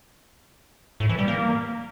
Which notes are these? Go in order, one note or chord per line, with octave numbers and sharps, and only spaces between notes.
A2
E3
G3
A#3